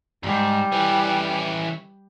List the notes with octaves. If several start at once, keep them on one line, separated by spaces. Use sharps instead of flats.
F2 G#2 G3
E3 C#4